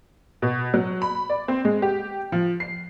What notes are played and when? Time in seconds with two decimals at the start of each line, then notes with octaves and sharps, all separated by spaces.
0.42 B2
0.74 F#3
1.02 B5
1.30 D5
1.48 C4
1.65 G#3
1.82 G4
2.32 F3
2.60 C7